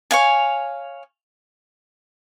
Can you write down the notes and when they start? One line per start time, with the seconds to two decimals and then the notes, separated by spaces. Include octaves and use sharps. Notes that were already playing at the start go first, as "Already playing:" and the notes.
0.11 C#5 F5 G#5